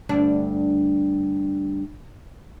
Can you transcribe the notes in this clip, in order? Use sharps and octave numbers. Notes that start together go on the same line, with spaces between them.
D2 G2 D4